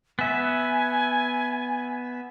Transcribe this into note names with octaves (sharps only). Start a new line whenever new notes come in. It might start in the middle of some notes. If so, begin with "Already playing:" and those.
B3 E5 G#5